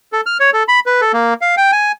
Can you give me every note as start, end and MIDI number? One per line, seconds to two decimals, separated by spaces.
0.13 0.21 69
0.26 0.38 89
0.40 0.50 73
0.53 0.63 69
0.68 0.80 83
0.86 1.01 71
1.02 1.12 69
1.14 1.34 58
1.41 1.55 77
1.57 1.71 79
1.72 1.92 80